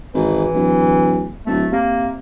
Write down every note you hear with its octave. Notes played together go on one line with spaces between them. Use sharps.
G#1 E3
D1
D1 A3
C3 A#3